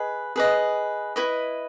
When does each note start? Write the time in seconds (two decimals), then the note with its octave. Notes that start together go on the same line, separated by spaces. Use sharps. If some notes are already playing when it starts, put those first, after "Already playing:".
Already playing: G#4 B4 D#5
0.36 G#4 B4 D#5
1.16 E4 B4 D#5